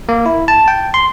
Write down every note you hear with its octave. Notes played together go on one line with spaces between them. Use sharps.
A#3
E4
A5
G5
C6